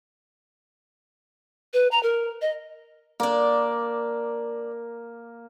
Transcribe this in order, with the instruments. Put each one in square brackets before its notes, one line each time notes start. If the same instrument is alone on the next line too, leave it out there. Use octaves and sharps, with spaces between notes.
[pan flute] B4
A#5
A#4
D#5
[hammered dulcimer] A#3 [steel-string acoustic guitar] D4 D5